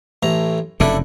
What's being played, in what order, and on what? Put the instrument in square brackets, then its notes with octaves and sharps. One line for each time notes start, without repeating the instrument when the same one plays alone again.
[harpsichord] A1 A2 A#5
[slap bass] F1 F#2 C#3 [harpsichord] D4 E4 A4